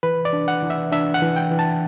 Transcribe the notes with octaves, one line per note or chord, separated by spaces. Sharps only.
E3 B4
D5
D4
F#5
E3
E5
D4 E5
F#5
E3
G5
E3
A5